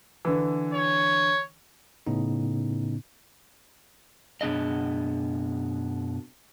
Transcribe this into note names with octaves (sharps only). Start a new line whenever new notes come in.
D3 E3
C#5
A2 C#3 B3 C#4 D#4
F#2 B2 D4 G#4 D#5